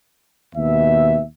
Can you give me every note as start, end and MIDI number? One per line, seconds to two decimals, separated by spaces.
0.55 1.24 39
0.55 1.24 47
0.55 1.24 76